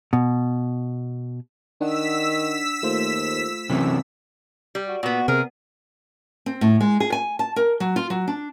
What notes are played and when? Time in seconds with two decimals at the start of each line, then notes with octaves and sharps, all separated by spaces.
0.13 B2
1.81 D#3 D4 F#5 E6 B6
2.83 D#2 A3 F4 C5
3.70 F#2 C3 E3 C4
4.75 G3
4.87 F#4
5.03 A#2 B3 F#4
5.28 C3 G#4 A#4
6.46 C4
6.61 A2
6.81 G#3
7.00 G#4
7.12 G#5
7.39 A5
7.56 A#4
7.80 F#3
7.96 F4
8.10 F#3
8.28 D4